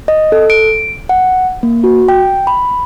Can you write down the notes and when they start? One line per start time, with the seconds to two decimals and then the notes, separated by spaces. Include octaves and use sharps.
0.08 D#5
0.32 A4
0.50 D7
1.09 F#5
1.63 A#3
1.84 F#4
2.08 G5
2.47 B5